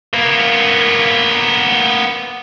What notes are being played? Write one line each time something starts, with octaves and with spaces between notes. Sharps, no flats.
A#3 B3